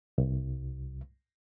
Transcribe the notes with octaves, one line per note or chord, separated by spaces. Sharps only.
C2